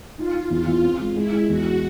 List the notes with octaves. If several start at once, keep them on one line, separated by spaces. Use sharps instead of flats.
D#4 F4
D#4
E2 F4
E2
C4
G#3
G#3 E4
G#3
E2 F#4